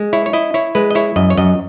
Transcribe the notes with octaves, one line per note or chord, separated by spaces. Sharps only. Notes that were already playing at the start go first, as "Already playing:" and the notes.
Already playing: G#3
E4 C#5
C#5
E4 D#5
E4 C#5
G#3 B4
D#5
E4 C#5
F#2 D#5
C#5
F#2 D#5